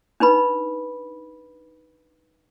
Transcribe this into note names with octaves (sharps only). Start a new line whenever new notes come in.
D4 D#4 B4 B5